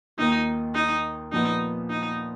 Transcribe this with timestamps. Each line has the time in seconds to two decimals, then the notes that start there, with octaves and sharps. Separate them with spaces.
0.17 D#2 D#3 A#3 D#4 F4
0.75 D#4
1.32 A#2 F3 B3 D#4
1.90 D#4